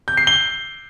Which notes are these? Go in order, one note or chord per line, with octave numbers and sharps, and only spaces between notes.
G6
C7
G7